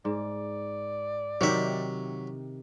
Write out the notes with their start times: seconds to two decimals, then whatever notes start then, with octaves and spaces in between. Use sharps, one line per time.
0.05 G#2 D5
1.41 C3 D#3 F#3 G4 E5